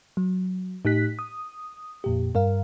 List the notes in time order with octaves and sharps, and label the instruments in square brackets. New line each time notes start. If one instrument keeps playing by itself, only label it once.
[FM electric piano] F#3
A2 D#4 G4 F#6 B6
D#6
F2 A#2 G4
G2 A#4 F5